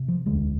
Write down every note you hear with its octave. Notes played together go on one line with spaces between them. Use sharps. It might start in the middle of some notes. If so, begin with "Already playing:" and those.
Already playing: C3
F3
E1 D2 D3 G#3